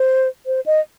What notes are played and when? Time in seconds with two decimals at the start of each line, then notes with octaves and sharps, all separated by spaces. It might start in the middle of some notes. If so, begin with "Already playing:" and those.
Already playing: C5
0.46 C5
0.66 D#5